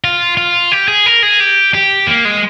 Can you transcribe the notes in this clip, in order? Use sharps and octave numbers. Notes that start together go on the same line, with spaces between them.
F4
F4
G4
G#4
A#4
G#4
G4
G4
A#3
G#3